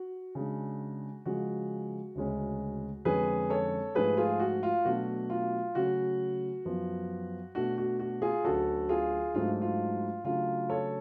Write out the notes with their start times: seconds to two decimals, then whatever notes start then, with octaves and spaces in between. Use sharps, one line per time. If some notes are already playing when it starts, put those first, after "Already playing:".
Already playing: F#4
0.35 C#3 G#3 D4
1.25 C#3 F3 G#3 F#4
2.15 D2 C#3 G#3 C#4
3.05 F2 D3 G#3 C#4 G#4 B4
3.50 A4 C#5
3.95 G#2 F3 A3 G#4 B4
4.17 F4 G#4
4.40 F#4
4.63 F4
4.85 B2 F#3 A3 D4 F#4
5.30 F4
5.75 C#3 F#3 A3 C#4 F#4
6.65 F#2 F3 B3
7.55 B2 A3 D4 F#4
7.78 F#4
7.99 F#4
8.22 F4 G#4
8.44 D2 D3 F#3 C#4 F#4 A4
8.89 F4 G#4
9.34 G#2 F#3 A3 D4 F4
9.62 F4
10.24 C#3 F#3 A3 D4 F4
10.69 A4 C#5